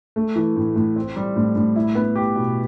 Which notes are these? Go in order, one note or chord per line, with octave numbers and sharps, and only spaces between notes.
A3
E3
A2
A2
C4
G3
A2
A2
E4
B3
G4
B2